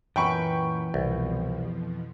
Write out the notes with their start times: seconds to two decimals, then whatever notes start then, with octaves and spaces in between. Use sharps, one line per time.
0.16 F#2 A#2 E3 B4 G5 B5 C#6
0.94 C2 F2 B2 F3